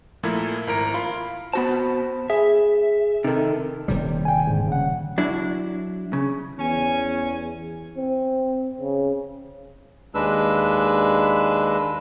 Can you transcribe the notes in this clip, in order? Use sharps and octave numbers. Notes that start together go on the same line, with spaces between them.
A#2 F3 A3 E4 A#4 G#6
G#1 E4 A#4 A#5 D7
F4 F5 B5
B3 F#4 C5 A5 B5
G#4 E5
C3 D#3 D#4 A4
D#1 C3 G3
G5 G#5
G#2 D3
C#3 F#5
F#3 D4 E4
C#3
E2 C#4 G#5
C4
C#3
D#2 G#3 D4 B4 E6